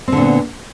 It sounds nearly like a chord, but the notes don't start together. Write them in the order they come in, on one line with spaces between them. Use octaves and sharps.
C4 D3 A#2 B3